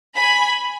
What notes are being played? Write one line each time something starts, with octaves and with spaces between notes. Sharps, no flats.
G#5 B5